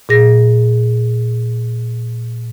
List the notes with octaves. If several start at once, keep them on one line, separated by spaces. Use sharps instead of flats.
A#2 G#4 A#6